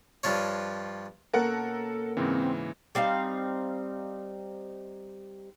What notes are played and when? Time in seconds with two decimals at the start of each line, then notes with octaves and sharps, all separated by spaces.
0.23 G2 F3 F4 C#5
1.34 B2 A#3 C#4 A4 A#4 F#5
2.17 G#2 C#3 E3 C4
2.95 G3 C4 D#4 F5